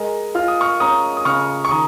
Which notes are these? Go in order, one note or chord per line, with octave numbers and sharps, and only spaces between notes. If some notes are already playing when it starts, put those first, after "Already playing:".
Already playing: G#3 A#4 D#5
F4 F6
D#6
C#6 F6
C#4 A#5 D#6
D#6
C#3 C#6 F6
C#6
D#3 A#5 D#6